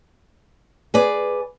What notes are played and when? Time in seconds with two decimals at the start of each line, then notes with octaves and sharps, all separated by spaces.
0.94 G#4 B4 D5